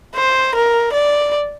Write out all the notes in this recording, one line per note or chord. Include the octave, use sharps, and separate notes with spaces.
C5
A#4
D5